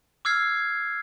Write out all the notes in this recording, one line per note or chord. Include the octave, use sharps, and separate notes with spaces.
D6 E6 F6 G#6 C7